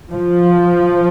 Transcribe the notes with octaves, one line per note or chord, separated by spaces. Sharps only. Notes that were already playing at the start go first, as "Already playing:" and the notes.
F3